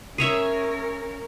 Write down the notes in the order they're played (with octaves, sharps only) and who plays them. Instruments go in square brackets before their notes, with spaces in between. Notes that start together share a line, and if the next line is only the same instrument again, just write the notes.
[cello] C#4 A#4 [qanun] G#4 C#5 E5